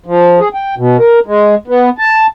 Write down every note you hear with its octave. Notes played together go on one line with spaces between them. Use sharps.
F3
G#4
G5
B2
A#4
G#3
B3
A5